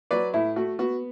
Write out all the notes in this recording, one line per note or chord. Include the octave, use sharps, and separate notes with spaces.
F#3 B4 D5
A2 E4
A3 F#4
B3 F#4